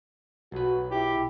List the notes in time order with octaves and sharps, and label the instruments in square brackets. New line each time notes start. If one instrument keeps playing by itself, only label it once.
[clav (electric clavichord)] B1 B4 [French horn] F#4
[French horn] E4 [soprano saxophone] G4